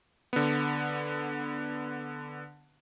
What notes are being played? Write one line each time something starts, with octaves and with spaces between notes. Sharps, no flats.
D3 B3